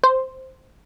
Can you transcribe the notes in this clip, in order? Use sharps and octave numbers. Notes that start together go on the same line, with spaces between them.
C5